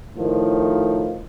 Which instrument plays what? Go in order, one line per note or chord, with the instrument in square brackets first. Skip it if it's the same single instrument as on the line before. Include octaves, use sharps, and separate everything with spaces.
[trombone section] A2 D#3 F3